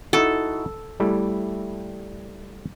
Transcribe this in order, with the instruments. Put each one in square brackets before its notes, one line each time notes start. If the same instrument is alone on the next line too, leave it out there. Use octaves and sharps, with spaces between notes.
[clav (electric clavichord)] D#4 E4 F#4 [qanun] A4
[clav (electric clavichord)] G3 A3 E4